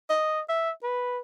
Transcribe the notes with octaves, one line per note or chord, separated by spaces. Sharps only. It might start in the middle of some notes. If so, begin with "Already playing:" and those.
D#5
E5
B4